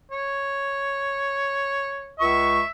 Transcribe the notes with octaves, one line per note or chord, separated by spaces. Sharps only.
C#5
C#2 E5 C#6